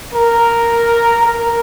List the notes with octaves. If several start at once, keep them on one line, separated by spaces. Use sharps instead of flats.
A#4
A#4